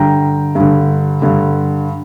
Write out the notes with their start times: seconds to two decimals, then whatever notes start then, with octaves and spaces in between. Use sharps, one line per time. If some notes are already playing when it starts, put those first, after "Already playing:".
Already playing: G2 D3 G5 A#5
0.55 G2 D3
1.22 G2 D3